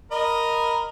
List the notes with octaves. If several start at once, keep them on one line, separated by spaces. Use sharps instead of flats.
A#4 D#5 B5